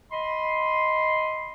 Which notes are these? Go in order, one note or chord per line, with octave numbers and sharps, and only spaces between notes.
D#5 B5 C6